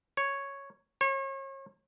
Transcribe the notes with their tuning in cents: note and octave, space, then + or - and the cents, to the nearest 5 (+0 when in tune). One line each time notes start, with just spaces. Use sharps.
C#5 +0
C#5 -35